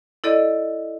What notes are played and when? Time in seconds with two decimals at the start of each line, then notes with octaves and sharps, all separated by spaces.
0.24 E4 A4 D5 D#5